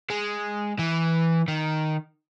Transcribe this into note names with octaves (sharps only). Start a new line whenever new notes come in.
G#3
E3
D#3